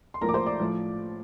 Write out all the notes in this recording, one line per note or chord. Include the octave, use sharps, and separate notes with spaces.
C6
A#1 A2 F3 A#4 A#5
D6
C5 C6
D5 D6
A2 F3